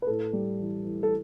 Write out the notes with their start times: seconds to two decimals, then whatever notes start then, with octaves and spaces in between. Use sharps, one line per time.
0.02 B4
0.07 A2 A4
0.33 G3
0.59 E3
0.85 E3
1.03 A4